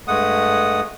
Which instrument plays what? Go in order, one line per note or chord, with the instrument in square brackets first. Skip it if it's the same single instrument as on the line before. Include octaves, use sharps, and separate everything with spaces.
[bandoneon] G2 G#3 A3 F#5 D#6